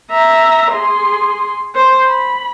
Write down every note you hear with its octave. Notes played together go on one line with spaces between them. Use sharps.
E5 A#5
G#4 C6
C5
B5